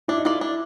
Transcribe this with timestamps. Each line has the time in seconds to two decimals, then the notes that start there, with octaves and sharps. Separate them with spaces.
0.08 D4 E4
0.18 D#4
0.25 E4 F4 A4 D5
0.41 D4